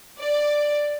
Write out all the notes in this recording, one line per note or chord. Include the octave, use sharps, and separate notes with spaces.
D5